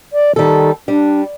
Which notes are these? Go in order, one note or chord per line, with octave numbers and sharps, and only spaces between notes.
D5
D#3 G3 A4
G3 D4